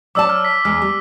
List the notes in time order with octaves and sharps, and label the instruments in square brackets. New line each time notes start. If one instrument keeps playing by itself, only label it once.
[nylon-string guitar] F#3 D5 A5 [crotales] D6 E6
[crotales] F6
B6
[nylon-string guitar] E2 G#3 [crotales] F6
[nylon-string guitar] G3